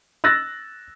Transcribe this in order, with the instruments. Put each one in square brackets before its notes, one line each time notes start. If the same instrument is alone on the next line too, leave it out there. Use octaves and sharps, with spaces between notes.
[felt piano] E6 F#6 A6 A#6